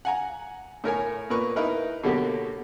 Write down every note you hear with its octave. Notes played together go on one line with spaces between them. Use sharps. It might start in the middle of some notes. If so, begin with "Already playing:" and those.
F#5 G#5 A#5
A2 A#4 C#5 G#5
A#2 A#4 B4 C#6
D#4 E4 A#4 B4
B2 D3 F#3 A#3 G4